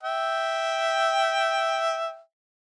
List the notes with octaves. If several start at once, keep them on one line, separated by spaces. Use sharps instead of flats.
E5 G5